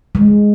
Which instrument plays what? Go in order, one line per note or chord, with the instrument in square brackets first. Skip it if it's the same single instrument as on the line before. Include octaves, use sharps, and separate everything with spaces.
[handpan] G#3